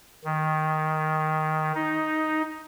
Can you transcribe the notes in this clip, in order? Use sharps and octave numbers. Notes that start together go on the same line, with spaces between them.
D#3
D#4